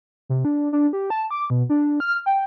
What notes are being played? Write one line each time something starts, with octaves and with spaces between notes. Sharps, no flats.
C3
D4
D4
G4
A5
D6
B2
D4
F6
G5